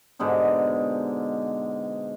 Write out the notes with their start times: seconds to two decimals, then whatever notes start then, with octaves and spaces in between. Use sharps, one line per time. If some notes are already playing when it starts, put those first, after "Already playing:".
0.19 G#2 B2 D3 D#4